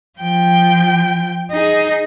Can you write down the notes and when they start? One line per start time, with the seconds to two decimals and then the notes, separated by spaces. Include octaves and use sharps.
0.19 F3 G5
1.51 D#4 G#4